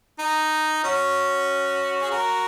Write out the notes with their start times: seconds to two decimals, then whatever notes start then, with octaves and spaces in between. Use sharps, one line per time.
0.19 D#4
0.83 C#4 F#4
2.02 G#4
2.11 F#4 A#4